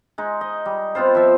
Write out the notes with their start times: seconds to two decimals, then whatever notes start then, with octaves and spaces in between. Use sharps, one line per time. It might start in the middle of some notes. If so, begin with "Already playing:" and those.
0.18 G#3 D#4
0.41 D#5
0.66 G3
0.95 B3 C4 F4 C5
1.15 F3 E5